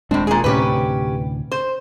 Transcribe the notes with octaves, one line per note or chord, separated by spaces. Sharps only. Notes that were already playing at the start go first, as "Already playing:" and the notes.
D#1 A2 G#3 C4 D4
A#2 G#4
D2 A2 C3 C#4 G4 B4
C5